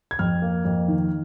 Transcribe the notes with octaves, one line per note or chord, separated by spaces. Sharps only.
G#6
F2 F6
A#3
F2
D#3